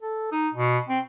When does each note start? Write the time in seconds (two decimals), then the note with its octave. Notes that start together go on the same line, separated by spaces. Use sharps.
0.01 A4
0.32 D#4
0.54 B2
0.89 C4